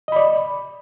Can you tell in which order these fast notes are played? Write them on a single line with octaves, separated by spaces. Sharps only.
D#5 B5 D5